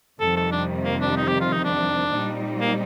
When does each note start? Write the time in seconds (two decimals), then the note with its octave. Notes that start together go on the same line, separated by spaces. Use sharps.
0.20 F2 C3 D#3 G3 A4
0.37 A4
0.52 D4
0.85 A#3
1.01 D4
1.17 D#4
1.28 G4
1.41 F4
1.53 D#4
1.65 D4
2.13 A#2 G3 C4 D#4
2.61 A#3